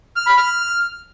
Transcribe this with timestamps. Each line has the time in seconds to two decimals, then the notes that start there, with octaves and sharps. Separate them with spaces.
0.16 F6
0.27 B5
0.37 F6